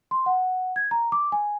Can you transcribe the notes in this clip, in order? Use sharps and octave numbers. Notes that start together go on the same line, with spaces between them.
C6
F#5
G#6
A#5
D6
G#5